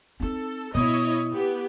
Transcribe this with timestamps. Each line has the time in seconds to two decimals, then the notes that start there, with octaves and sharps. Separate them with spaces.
0.20 C4 D#4 A4
0.75 B2 B3 E4 C#5 D#5
1.32 B3 G4